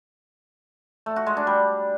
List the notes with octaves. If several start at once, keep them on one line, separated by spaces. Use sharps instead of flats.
A3
F#4
G#3
D4
G3